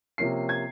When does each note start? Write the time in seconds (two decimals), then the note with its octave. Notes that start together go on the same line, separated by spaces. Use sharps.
0.18 C3 F3 A#3 C#4 C7
0.49 G#6